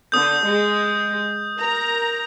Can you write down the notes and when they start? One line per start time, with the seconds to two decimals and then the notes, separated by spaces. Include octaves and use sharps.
0.12 D3 D#6 G6
0.45 G#3
1.59 A#4 A#5